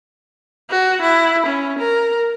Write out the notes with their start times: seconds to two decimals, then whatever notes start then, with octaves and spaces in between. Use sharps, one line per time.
0.70 F#4
1.02 E4
1.46 C#4
1.79 A#4